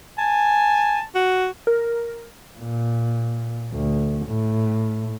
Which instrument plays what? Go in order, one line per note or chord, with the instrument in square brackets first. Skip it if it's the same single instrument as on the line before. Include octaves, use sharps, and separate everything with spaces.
[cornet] G#5 [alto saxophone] A5
[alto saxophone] F#4
[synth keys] A#4
[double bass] A#2
D2
A2